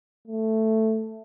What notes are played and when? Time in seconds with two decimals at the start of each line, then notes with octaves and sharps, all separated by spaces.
0.28 A3